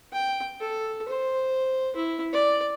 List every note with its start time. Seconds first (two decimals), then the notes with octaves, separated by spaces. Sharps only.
0.13 G5
0.61 A4
1.08 C5
1.96 E4
2.33 D5